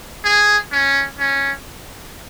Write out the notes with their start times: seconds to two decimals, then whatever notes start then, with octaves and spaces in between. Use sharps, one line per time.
0.24 G#4
0.72 C#4
1.19 C#4